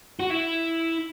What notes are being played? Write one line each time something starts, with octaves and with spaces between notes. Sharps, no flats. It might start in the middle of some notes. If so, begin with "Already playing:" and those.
F#4
E4